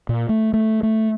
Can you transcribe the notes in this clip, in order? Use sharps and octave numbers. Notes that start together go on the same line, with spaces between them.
A#2
A3
A3
A3